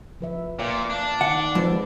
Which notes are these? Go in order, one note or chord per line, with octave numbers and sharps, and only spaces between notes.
F3 B4 E5
A#2 A#3 D5 F5
D4 F5
D#3 F#5
F2 G#3 B4